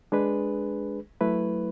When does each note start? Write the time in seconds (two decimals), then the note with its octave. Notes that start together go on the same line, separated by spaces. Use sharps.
0.12 G#3 D4 G#4 B4
1.21 F#3 A3 E4 B4